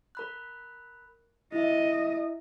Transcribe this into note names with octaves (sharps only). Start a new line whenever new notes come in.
A#4 B5 F#6
E4 D#5 E5